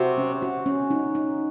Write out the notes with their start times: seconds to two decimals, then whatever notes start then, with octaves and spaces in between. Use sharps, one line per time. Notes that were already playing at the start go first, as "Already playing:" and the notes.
Already playing: C3 F#4
0.18 C#4
0.42 F#4
0.66 C#4
0.91 D#4
1.15 D#4